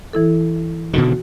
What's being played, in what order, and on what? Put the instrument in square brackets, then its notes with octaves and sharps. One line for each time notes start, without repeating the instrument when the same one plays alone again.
[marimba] E3 E4 A4
[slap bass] B2 D3 D#3 [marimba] F#4